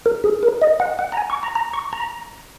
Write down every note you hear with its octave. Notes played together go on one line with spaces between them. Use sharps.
A#4
G#4
A#4
D#5
F#5
F#5
A#5
G#5
C#6
A#5
A#5
C#6
A#5